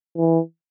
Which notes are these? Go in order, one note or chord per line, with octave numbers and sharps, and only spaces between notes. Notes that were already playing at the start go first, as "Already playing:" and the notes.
E3